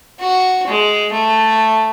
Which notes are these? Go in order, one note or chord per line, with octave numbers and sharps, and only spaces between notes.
F#4
G#3
A3